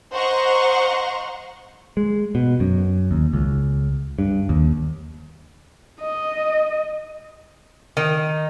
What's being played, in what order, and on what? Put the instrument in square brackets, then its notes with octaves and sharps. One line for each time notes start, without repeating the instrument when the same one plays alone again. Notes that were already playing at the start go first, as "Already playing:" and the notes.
[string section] C5 D#5 F#5 A#5 C6 C#6
[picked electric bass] G#3
B2
F#2
D#2
C#2
G2
D#2
[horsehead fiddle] D#5
[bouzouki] D#3